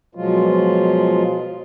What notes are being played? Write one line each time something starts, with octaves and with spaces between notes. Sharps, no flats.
B2 F3 F#3 G#3 F4